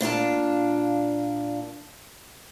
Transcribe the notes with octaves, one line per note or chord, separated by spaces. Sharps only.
A#2 D4 F4 A5